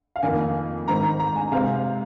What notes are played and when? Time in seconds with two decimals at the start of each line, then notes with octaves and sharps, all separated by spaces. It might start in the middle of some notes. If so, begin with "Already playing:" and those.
0.16 F5
0.23 F2 D#3 A#3 G#5
0.87 G#2 D#3 C4 A#5
1.03 A#5
1.19 A#5
1.36 G#5
1.52 C3 G#3 C4 F5